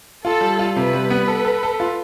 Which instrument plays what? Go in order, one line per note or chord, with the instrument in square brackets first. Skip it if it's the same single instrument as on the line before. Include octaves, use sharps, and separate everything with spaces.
[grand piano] F4 [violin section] A4
[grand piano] G3
F4
[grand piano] C3 [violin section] B4
[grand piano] G3
B3
A4
A4
A4
F4